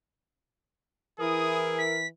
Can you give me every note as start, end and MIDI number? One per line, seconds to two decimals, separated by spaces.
1.20 2.07 52
1.20 1.97 64
1.20 1.84 68
1.20 1.97 70
1.20 1.58 87
1.78 2.07 95